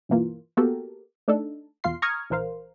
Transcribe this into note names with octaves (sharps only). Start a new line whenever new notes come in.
G2 B2 E3 A#3 F4
A#3 B3 F#4 G4 A4 A#4
A3 D4 D#4 A4
E2 B2 F4 F5 C6 C7
A#5 C#6 D#6 F6 G#6
A#1 E3 A#4 C5 F5